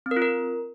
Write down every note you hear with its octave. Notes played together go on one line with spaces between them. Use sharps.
C4
A#4
F4
A#4